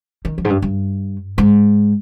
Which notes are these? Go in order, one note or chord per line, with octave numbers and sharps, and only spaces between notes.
D#3
F2
G#2
G2
G2
G#2